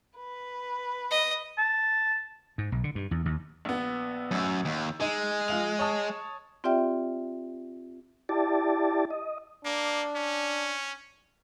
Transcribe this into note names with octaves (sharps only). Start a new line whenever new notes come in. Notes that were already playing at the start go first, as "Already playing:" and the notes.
B4
D#5
A5
G#2
B1
D3
G2
E2
D#2
A#1 B3
A1 F#2 E6
D#2
G#3 D#4
F3 F5 F7
C#5 A5 D#6
C4 F4 G4 D5 E5 G5
E4 G4 D5 A5
D#5
A#3 D4
C#4